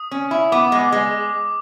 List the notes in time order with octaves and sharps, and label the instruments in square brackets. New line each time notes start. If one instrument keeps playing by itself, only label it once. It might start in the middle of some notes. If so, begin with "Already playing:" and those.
Already playing: [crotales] D#6
[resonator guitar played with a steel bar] C#4
E4
[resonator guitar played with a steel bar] B3 [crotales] D6
[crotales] D6
[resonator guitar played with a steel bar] G#3
[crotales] D6
[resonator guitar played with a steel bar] G#3